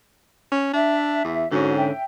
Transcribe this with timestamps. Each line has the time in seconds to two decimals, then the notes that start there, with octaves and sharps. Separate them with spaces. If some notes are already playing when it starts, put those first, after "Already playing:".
0.52 C#4
0.73 D4 E5
1.24 E2
1.51 G#2 D3 C#4 F#4
1.77 E5 G5